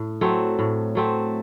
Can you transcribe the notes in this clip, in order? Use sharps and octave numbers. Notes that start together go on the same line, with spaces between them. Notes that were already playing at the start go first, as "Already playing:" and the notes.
Already playing: A2
F#3 A3 C4
A2
F#3 A3 C4